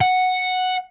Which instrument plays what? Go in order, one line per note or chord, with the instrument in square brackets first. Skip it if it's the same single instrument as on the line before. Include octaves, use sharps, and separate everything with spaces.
[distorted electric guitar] F#5